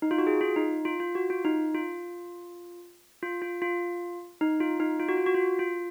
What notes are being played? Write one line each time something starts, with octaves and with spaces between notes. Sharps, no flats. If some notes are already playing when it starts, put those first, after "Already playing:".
D#4
F4
F#4
G#4
F4
D#4
F4
F4
F#4
F4
D#4
F4
F4
F4
F4
D#4
F4
D#4
F4
F#4
F4
F#4
F4
F4